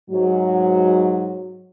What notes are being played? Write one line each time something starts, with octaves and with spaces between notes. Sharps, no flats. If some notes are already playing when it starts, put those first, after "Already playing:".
G#2 F#3